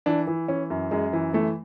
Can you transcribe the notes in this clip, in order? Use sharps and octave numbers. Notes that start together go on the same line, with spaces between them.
E3 D4
E3
E3 C#4
F#2
F#2 G#3
E3
E3 A3